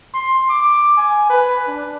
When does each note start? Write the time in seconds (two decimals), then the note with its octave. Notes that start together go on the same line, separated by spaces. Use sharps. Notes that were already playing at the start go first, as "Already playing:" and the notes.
0.14 C6
0.50 D6
0.97 G#5
1.30 B4
1.67 D4